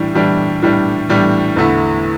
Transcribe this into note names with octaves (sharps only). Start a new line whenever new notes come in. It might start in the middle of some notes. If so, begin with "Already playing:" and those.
Already playing: A2 E3 G3 D4
A2 E3 G3 D4
A2 E3 G3 D4
A2 E3 G3 D4
E2 D3 A3 E4